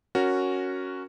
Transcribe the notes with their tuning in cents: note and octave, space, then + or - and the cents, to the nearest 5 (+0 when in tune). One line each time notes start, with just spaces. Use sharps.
C#4 +0 F#4 +0 A#4 +0